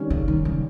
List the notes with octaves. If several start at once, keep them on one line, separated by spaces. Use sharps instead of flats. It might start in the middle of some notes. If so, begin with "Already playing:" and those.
Already playing: D#3 G3 C#4
C#3
D#3
C#3